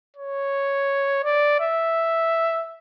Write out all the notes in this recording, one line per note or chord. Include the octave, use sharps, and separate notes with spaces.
C#5
D5
E5